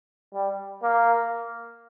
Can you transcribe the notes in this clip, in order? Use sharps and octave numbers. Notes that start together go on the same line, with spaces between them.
G3
A#3